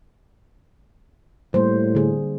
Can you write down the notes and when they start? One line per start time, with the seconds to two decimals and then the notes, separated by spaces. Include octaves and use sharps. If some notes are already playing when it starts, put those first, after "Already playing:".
1.54 A2 G3 A#3 C5
1.95 D3 G#4